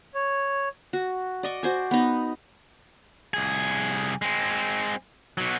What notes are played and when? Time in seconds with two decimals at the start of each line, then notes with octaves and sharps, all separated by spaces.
0.15 C#5
0.93 F#4
1.43 D5 D#5 C#6
1.63 F#4 C5 G#5
1.91 B3 D#4
3.34 C2 G#4
4.22 G#3 C4
5.38 B2 F#3